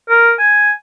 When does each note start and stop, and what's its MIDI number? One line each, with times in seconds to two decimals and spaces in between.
0.09 0.33 70
0.39 0.70 80